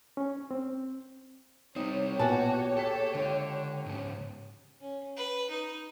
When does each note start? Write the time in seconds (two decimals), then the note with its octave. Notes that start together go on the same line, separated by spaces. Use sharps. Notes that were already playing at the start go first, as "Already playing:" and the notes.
0.17 C#4
0.51 C4
1.76 G3 C4 D#4 G4 C#5
2.19 B1 A#2 F#4 B4 F#5 G#5 A5
2.77 G#4 A4 B6
3.15 C#2 D3
3.86 G#2 C#3
4.80 C#4
5.17 B4
5.51 D#4